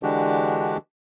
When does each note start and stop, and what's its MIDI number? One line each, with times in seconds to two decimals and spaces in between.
0.03 0.77 50
0.03 0.77 52
0.03 0.77 56
0.03 0.77 62
0.03 0.77 66
0.03 0.77 67